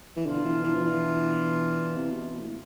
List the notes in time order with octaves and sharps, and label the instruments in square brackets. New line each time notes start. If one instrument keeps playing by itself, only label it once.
[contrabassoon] E3
[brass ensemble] B2 B3 D4 F4 [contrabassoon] D3
[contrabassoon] E3
E3
F3
E3
C3
B2
B2
A2